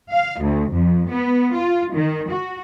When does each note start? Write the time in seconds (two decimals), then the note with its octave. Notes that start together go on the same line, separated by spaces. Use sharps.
0.12 F5
0.41 D2
0.73 F2
1.09 B3
1.55 F4
1.94 D#3
2.30 F#4